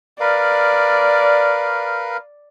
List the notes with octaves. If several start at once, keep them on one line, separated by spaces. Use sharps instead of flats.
A#4 B4 D5 F5